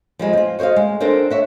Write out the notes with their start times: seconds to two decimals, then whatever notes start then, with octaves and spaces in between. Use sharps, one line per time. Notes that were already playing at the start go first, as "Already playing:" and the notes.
0.19 F3 G3 G#3
0.33 C4 F4
0.59 F#4 C5 C#5 D#5 F5
0.76 G#3
1.00 C4 D4 F4 A4 A#4 C5
1.30 C#5 E5 F#5